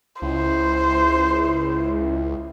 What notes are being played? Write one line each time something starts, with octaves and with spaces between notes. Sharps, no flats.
C#2 E4 C5